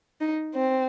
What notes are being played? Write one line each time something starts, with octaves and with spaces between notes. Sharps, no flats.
D#4
C4